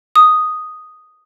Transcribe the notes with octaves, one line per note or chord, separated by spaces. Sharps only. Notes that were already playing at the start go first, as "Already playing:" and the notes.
D#6